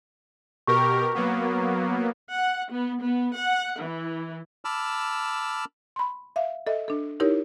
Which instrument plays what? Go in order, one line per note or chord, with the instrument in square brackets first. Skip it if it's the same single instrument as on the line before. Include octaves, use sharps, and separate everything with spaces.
[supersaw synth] B2 G4 A#4 [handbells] C#6
[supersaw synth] F#3 A#3 B3
[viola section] F#5
B3
B3
F#5
E3
[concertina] A5 B5 D6 E6 F6
[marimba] B5 C6
E5 F5
A4 D#5 E5
D4 A4
D#4 E4 G4 A#4 C#5